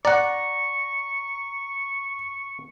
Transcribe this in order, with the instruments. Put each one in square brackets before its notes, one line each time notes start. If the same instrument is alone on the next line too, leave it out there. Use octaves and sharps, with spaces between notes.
[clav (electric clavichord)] D5 F#5 [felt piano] A#5 [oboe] C#6